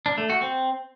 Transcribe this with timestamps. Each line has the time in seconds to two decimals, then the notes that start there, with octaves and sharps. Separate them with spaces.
0.06 D4
0.18 A3
0.30 F#4
0.41 C4